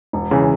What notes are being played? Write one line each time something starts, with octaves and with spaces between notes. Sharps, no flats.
E1
C#3 E3